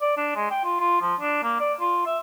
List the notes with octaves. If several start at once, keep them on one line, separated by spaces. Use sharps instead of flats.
D5
D4
G#3
G5
F4
F4
F3
D4
A#3
D5
F4
E5